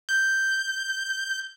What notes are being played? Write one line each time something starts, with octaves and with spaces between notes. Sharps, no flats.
G6